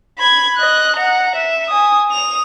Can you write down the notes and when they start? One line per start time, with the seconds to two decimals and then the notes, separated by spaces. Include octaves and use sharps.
0.19 B5 G#6
0.57 D#5 F#6
0.96 F#5 A#5
1.35 E5
1.68 G#5 D#6
2.10 D#6 F7